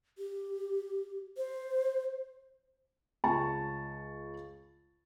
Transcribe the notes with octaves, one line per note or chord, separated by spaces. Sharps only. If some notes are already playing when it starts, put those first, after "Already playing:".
G4
C5
C#2 A5 C#6